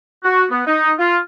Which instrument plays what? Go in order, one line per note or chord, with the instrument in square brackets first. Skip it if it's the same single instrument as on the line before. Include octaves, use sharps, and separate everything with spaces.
[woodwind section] F#4
B3
D#4
F4